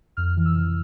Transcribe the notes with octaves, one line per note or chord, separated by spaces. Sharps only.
F2 F6
E3
E6
C3